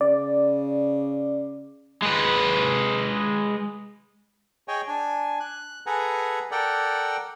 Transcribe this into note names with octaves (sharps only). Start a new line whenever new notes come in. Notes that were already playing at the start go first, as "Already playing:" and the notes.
C#3 D5
G#3 B4
G#4 C#5 D#5 G5 G#5
D4 G#5
F#6
G#4 A4 B4 F#5 G#5 A#5
A4 A#4 D5 F#5 G5